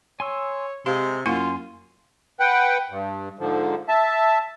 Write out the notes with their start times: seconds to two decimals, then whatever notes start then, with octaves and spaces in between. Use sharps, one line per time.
0.20 C#5 G#5 C6 E6
0.86 C3 G#3 G4 F5 C6
1.26 F#2 A#3 E4 F4 F#5 G#5 C6
2.40 B4 F#5 G5
2.90 G2
3.39 G#2 D3 F3
3.88 E5 A5